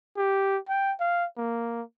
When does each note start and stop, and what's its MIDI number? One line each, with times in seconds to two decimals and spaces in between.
0.17 0.58 67
0.69 0.93 79
1.00 1.26 77
1.37 1.82 58